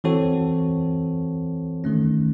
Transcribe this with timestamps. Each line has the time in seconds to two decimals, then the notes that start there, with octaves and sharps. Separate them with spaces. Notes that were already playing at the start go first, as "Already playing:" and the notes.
0.04 E3 C4 F#4 A4 C#5
1.84 D#3 A3 C#4